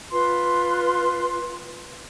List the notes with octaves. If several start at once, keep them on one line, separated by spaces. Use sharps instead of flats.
F4 B4 C6